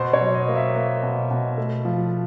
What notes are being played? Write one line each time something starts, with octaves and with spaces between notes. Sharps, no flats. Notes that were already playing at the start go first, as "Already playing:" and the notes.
Already playing: B2 C5
C#5
F#3
D#5
A#3
E5
A#3
B2
B2
A3
F3